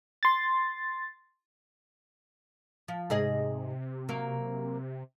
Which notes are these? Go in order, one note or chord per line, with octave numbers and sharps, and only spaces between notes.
C6 A6
F3
G#2 C3 G#4 D#5
F#3 A#3